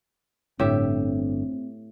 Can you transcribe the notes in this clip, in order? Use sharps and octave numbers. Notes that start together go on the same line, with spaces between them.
G1 A2 D3 C4 G4 E5